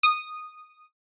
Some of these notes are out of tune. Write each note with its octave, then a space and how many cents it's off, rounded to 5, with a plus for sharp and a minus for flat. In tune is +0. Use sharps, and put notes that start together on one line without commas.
D#6 -10